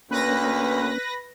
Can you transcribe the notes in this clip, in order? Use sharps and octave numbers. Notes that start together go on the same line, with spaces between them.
D2 A#3 C#4 B4 A#6